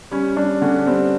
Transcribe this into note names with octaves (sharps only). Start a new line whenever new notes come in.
G3 C#4
G3 D4
D3 C#4
G3 C4